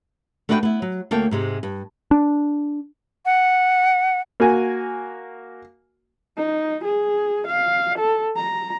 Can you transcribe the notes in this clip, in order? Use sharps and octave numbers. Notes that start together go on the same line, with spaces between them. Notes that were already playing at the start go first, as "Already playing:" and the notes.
A3 D4 F#4 B4 D5 G5
B3 E4
F#3
D2 A#3 A4 C#5 G5
G#2 C3 G#3
G2
D4
F#5
A#3 F#4 G#5
D#4
G#4
F5
A4
A#5